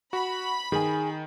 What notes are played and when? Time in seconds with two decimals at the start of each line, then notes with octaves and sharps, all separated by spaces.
0.13 F#4 B5
0.72 D#3 G#4 G#5